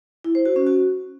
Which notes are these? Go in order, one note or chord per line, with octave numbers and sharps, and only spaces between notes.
E4
C5
F#4
C#4
F#4